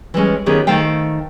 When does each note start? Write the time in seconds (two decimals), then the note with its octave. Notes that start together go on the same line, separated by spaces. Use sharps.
0.14 E3 G3 G#3 C#4
0.46 D#3 B3 C#4 G4 G#4
0.67 D#3 A3 C5 F5 G5